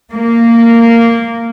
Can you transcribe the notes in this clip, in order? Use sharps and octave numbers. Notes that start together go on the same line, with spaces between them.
A#3